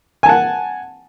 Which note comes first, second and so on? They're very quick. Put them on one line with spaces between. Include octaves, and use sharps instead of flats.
G#5 A5 F#5